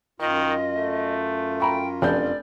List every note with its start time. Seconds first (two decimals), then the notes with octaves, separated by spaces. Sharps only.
0.20 F#2 D#3 F4 D#5
0.74 A3
1.60 G5 A#5 B5 C#6
2.02 F1 D4 D5 G6